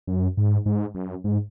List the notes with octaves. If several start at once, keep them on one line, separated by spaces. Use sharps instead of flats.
F#2
G#2
G#2
F#2
G#2